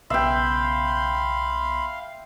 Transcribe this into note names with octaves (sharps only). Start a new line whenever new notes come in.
B1 C#3 B3 E5 F5 G5 B5 C6